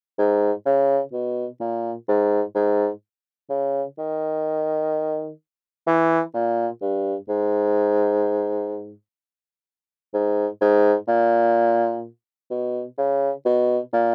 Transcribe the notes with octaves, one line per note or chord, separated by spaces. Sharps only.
G#2
C#3
B2
A#2
G#2
G#2
C#3
D#3
E3
A#2
G2
G#2
G#2
G#2
A#2
B2
C#3
B2
A#2